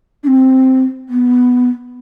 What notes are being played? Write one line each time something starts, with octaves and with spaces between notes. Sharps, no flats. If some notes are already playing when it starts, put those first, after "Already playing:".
D4
C4
B3